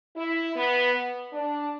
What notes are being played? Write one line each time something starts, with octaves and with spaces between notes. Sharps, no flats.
E4
B3
D4